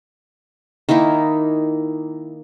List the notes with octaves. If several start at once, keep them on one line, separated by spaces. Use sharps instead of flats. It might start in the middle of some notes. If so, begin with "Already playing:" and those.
D#3 A#3 D#4 E4